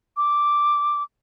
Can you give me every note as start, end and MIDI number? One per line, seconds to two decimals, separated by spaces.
0.17 1.03 86